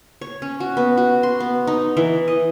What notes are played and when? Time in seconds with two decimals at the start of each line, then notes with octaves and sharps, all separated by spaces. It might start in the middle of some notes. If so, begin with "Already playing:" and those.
0.21 C#5
0.42 C#4
0.60 F#4
0.77 B3
0.97 F#4
1.23 C6
1.40 B3
1.67 D#4
1.97 E3
2.28 D#5